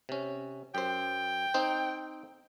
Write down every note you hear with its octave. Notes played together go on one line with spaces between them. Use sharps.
C3 C#4
F#2 C5 G5
C4 D#4 C5